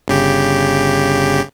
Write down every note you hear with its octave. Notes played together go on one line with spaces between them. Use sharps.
G1 C#3 G4